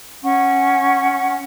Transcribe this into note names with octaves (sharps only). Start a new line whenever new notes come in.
C#4 F#5 G#5 C#6